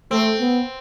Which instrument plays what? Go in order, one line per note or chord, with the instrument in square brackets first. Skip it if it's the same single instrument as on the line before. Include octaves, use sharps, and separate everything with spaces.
[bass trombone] A3 [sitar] C4
[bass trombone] B3